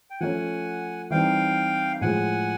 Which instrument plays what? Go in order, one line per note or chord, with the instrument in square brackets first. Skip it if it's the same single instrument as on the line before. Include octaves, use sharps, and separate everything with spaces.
[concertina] G5
[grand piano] F3 A3 C#4 [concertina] F#5 G#5
[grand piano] E3 G3 C4 D#4 [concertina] F5 G5
[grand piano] A2 F3 G#3 [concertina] F#5 G#5